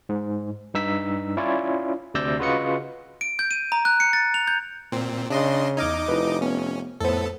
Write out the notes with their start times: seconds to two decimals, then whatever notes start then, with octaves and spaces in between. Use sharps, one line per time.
0.09 G#2
0.74 G2 D#4 E6 B6
1.37 C#4 E4 F4 C#5 D5
2.14 D2 C3 D5 E6 G6 A#6
2.39 C#3 F4 F#4 B4 D#5 C#7
3.21 D7
3.39 G6
3.51 D#7
3.72 A#5
3.85 F#6
4.00 C#7
4.13 A6
4.34 F7
4.47 G6
4.92 A#2 C4
5.30 C#3 D4 D#5 C6
5.77 E2 D#4 D#5 D6 F6 G#6
6.08 F1 E4 B4
6.42 B3 C#4
7.00 F2 A2 B3 A4 C5